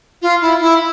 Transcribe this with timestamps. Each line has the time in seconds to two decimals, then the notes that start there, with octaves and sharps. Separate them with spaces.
0.22 F4
0.42 E4
0.61 E4